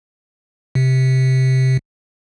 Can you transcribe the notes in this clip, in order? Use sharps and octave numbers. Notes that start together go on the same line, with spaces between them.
C3